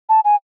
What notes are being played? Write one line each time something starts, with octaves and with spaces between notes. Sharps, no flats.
A5
G#5